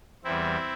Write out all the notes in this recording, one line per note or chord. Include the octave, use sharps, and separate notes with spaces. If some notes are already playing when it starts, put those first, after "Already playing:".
E2 E3 G3 C4 E4